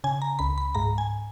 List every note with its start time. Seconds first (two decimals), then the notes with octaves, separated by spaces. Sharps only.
0.04 C#3 G#5
0.22 A#5
0.39 C#2 B5
0.58 B5
0.75 G#2 A#5
0.98 G#5